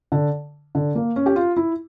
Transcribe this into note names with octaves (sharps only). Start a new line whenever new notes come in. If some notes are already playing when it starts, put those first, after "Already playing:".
D3
D3
A#3
C#4
G4
F4
E4